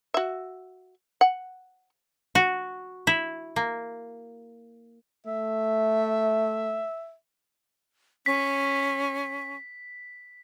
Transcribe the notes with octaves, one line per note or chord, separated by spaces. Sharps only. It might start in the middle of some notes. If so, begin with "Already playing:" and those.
F#4 E5
F#5
F#4
E4
A#3
A3 E5
C#4 B6